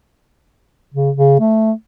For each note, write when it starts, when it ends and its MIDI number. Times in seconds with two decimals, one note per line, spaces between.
0.94 1.11 49
1.17 1.39 49
1.40 1.72 57